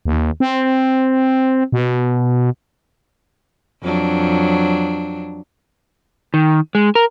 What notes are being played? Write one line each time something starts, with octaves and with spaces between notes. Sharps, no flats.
D#2
C4
B2
F2 F#3 D4
D#3
G#3
A#4